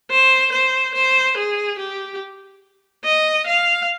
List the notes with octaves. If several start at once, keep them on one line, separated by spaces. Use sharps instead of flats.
C5
C5
C5
G#4
G4
D#5
F5